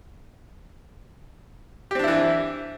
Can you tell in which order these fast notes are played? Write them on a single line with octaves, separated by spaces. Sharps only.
G4 C4 D4 E4 E3